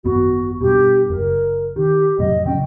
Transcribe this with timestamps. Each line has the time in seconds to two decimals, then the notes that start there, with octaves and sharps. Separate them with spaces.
0.04 G#1 F#2 B3 F#4
0.61 G2 B2 G4
1.10 F#1 A#4
1.76 D#3 G4
2.19 F1 A2 F#3 D#5
2.46 C#3 F#3 C#4 G5